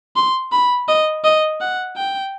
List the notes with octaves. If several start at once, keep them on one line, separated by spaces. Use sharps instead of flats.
C6
B5
D#5
D#5
F#5
G5